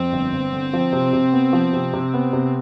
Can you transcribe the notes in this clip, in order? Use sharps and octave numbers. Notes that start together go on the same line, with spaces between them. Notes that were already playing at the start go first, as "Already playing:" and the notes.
Already playing: F2 C4
G1
G1
D3
F3
C3
C3
B3
F3
C3
C3
B3
C3